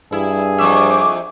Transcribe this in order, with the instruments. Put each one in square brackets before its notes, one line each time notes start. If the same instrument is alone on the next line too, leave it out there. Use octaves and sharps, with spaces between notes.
[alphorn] G2 [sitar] E4 [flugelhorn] G#4
[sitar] F2 E5 [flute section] C#6 D6